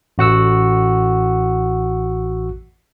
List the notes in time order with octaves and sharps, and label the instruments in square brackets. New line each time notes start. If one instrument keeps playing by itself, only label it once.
[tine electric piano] A1 F#4 F#5 E6